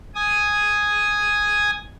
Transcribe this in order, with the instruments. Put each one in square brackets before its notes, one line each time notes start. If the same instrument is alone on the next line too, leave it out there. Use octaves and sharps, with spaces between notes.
[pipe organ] G#5 D#6